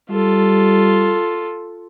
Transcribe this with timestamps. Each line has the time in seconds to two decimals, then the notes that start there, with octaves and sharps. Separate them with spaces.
0.10 G3 F4 A4